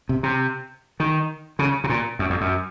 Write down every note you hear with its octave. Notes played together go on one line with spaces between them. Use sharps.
C3
C3
D#3
C#3
C3
A#2
F#2
F2
F#2